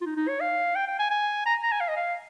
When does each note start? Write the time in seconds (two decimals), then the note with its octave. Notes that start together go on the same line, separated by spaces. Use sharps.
0.01 F4
0.06 D#4
0.16 D#4
0.28 C#5
0.41 F5
0.75 G5
0.87 G5
0.99 G#5
1.10 G#5
1.46 A#5
1.63 A#5
1.72 G#5
1.81 F5
1.89 D#5
1.96 F5